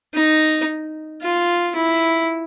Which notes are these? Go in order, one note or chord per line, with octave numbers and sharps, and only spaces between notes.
D#4
F4
E4